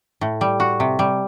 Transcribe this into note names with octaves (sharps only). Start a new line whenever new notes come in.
A2
G3
F#4
C3
G3